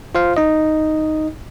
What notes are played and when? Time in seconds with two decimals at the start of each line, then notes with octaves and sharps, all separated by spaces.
0.15 F4 C5 F5
0.37 D#4 D#5